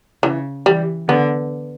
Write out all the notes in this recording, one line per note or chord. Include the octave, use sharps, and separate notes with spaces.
C#3 E3
E3 G3
D3 B3